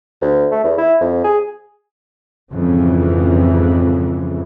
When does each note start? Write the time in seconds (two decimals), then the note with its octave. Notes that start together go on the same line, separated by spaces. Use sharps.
0.21 D2
0.51 A3
0.64 E2
0.78 E4
1.00 F2
1.24 G#4
2.52 F2 G#2 C#3 E3